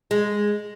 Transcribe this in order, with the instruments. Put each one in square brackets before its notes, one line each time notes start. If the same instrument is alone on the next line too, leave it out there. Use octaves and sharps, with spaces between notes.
[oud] G#3